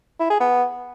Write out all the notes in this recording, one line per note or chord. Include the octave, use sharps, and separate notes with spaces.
E4
G#4
B3